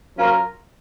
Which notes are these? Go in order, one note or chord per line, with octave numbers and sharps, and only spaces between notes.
F#3 C#4 F4 A#4